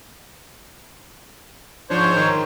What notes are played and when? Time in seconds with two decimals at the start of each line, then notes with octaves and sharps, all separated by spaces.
1.90 G#2 F3 D4 C5 C#5
2.17 D#3